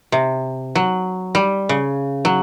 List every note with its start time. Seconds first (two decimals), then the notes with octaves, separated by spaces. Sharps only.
0.12 C3
0.75 F#3
1.35 G3
1.69 C#3
2.25 F#3